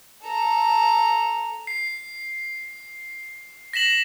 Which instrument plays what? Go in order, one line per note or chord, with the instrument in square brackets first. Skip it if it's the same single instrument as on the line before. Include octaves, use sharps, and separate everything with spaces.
[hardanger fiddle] A4 A#5
[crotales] C7
A#6 B6 E7 F#7